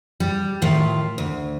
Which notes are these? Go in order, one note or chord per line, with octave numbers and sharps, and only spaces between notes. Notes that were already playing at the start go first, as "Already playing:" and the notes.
G3
A2 D#3 F4 E5
D2